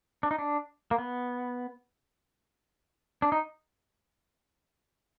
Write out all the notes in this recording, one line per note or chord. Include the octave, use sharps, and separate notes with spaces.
D4
D#4
D4
A#3
B3
D4
D#4